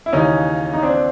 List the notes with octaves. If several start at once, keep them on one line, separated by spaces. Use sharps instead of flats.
E4
D#2 C#3 E3 C#4 D#4
D#4
C4 D4